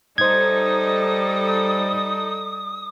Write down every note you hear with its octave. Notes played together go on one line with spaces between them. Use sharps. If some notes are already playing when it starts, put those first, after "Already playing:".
G3 D#4 A4 C5 D#6 G#6